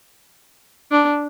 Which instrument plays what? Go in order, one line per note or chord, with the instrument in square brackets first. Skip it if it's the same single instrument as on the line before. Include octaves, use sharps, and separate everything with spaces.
[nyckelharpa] D4